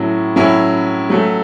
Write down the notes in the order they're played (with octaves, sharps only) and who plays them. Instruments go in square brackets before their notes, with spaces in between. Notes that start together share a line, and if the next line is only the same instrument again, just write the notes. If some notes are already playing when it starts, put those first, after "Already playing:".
Already playing: [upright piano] A2 F#3 C#4 E4
A2 F#3 C#4 E4
F#3 A3 C#4